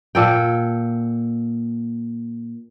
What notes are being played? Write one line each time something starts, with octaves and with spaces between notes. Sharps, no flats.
A#2 A4 G5